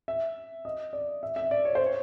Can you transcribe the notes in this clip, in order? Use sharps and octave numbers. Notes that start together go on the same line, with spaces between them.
E5
D#5
D5
E5
E5
D5
C#5
C5
C#5